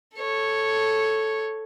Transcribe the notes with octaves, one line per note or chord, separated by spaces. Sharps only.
A4 C#5